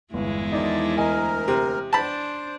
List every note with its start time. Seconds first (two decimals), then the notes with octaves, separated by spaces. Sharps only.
0.14 G1 E2 G#3 E4
0.52 D#3 F3 D#4 D5
0.97 D2 A#4 D#5 G#5 A#5
1.48 C3
1.93 D4 C5 A5 B5